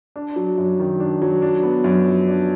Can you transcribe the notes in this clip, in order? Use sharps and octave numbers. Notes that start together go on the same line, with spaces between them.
D4
F#3
F#2
D#3
D4
F#3
D4
B3
F#2
F3
D4